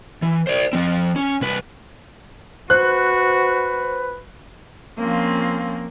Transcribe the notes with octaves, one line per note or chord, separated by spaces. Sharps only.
E3
C5 D5
F3 C4
C#4
C2 B4
F#4 B4 C5 F#6
F3 A#3 C4 C#4 F4